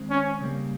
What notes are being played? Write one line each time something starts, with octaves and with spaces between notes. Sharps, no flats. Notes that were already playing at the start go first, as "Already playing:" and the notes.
Already playing: D#3 G#3 C4
C#4
C#3 G3 A#3